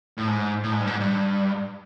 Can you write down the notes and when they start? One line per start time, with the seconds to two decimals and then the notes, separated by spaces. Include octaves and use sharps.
0.17 A2
0.28 G#2
0.63 A2
0.72 G#2
0.80 G2
0.87 G#2
1.00 G2